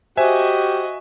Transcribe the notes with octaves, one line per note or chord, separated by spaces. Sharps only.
F#4 G4 C5 D#5 E5 G#5